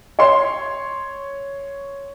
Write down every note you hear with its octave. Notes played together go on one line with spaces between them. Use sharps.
C#5 C6